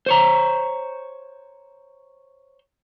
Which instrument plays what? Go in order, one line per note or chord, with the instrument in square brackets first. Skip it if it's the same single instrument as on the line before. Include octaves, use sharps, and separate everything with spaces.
[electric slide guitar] C5 C#5 A#5